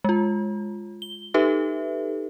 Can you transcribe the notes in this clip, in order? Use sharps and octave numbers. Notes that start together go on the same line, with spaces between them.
G#3 F4
G7
D#4 G4 A4 B4 E5